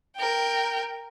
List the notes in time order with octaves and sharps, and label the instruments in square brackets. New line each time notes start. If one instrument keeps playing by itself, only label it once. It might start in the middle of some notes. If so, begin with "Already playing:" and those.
[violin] A#4 G5